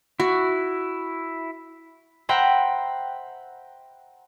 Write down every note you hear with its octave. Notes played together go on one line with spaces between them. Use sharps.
E4 F#4
C5 E5 F#5 G5 A#5 B5